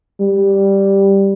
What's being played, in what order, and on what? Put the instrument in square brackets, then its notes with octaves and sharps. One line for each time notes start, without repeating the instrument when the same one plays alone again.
[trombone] G3